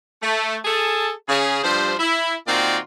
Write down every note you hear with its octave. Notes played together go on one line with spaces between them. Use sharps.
A3
G#4 A4 A5
C#3 G#4
G2 F3 G3 C5
E4
A#2 D#3 C4 F4 F#4 D5